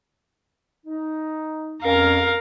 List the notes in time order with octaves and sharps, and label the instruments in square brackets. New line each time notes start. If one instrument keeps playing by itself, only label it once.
[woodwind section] D#4
[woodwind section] F2 C#4 [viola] A#4 F5